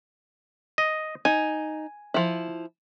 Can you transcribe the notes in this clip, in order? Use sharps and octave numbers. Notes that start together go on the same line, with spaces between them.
D#5
D#4 G#5
F3 E4